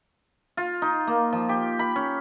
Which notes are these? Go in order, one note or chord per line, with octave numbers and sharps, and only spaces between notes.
F4
D#4
A#3
F3
G4
B5
C#4